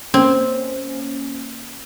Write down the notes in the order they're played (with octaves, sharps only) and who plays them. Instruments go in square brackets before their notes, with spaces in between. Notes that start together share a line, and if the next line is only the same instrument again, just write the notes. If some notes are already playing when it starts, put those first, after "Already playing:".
[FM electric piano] A#3 C#4 [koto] C4